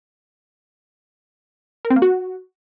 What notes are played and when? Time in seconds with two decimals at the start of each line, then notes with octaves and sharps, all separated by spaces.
1.85 A#4
1.90 C4
1.96 A#3
2.02 F#4